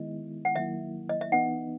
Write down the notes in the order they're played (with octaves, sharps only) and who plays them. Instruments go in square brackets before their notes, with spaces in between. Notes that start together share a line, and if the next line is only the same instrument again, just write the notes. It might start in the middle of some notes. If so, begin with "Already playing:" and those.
Already playing: [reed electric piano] D#3 G#3 B3 E4 [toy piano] D#5
[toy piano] F#5
[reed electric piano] D#3 F#3 A#3 E4 [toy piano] E5
[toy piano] D#5
E5
[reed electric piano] E3 B3 D#4 [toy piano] F#5